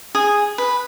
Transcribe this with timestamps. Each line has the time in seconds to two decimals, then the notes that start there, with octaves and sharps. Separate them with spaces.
0.15 G#4
0.58 B4